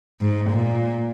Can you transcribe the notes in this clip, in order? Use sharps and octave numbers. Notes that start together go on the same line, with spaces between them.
G#2
A#2